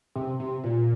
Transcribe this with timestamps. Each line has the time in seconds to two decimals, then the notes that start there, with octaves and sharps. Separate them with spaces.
0.16 C3
0.40 C3
0.63 A#2